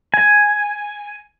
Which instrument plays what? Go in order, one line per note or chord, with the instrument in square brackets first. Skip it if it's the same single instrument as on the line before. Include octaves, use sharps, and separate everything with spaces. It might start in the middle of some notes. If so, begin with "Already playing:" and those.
[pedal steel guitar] G#5